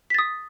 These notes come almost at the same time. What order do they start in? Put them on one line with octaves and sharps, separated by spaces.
B6 A6 D#6